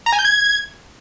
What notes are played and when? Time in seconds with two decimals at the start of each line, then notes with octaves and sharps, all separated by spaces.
0.06 A#5
0.12 G#5
0.19 G6
0.25 G#6